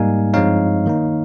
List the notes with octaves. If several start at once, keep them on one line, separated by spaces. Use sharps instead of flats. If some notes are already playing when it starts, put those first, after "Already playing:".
Already playing: G#2 G3 A#3 D#4 F5 G#5
G2 F3 G#3 C4 D#4 C#5 F5
D#3 A#3 D#4